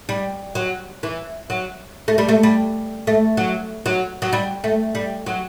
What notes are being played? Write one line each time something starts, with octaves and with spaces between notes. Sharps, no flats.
G3
F#3
E3
F#3
A3
G3
A3
G3
A3
F#3
F#3
F#3
G3
A3
G3
F#3